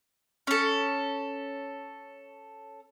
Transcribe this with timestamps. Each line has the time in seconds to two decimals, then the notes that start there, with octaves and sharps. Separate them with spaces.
0.47 C#4 A4